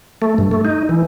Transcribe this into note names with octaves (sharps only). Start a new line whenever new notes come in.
A3
G2
A3
D#4
E3